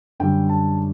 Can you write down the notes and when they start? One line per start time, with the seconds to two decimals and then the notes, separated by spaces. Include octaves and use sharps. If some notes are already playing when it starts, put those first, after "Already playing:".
0.20 F#2 D3 G3 G5
0.50 A5